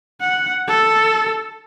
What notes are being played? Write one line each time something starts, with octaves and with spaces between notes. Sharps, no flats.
F#5
A4